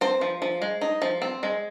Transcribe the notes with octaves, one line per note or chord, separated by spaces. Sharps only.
C4 C5
F3
F3
G#3
D#4
F3
C4
G#3